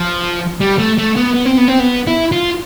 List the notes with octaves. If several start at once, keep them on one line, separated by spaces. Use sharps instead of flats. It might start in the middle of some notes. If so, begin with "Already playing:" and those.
Already playing: F3
G3
A3
A3
B3
B3
C4
B3
C4
B3
E4
F4